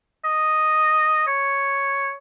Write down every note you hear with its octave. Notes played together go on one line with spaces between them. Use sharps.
D#5
C#5